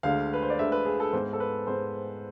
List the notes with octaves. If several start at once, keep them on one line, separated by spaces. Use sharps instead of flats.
D2 D3 G#3 F5
B4
C5
D5
D2 D3 G#3 E5
B4
G#4
A4
G#2 G#3 B3 C5
A4
B4
G#2 G#3 B3 C5